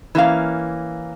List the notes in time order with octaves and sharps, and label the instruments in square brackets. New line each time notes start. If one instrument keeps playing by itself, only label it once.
[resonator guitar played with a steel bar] E3 A#3 C#4 F5